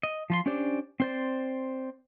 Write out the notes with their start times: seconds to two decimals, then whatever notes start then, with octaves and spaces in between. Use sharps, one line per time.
0.03 D#5
0.30 F3 F4 C6
0.46 C#4 D4 G4 C5 D5
1.00 C4 C5 D5